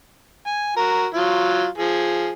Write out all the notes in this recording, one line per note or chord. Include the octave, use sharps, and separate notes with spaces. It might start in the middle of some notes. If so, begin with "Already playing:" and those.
G#5
F#4 A#4
F#3 F4
F3 G#4